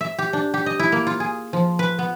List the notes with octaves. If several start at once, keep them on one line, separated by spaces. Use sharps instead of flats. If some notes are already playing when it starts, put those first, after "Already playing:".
E5
G4
D4
G4
D#5
E4
A#3
F4
G#4
F3
B4
B3